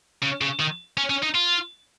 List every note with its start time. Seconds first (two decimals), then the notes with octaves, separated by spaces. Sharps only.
0.23 C#3
0.41 C#3
0.60 D#3
0.97 C#4
1.10 C#4
1.22 D#4
1.34 F4